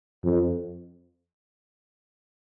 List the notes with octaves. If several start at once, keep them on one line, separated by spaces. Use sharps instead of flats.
F2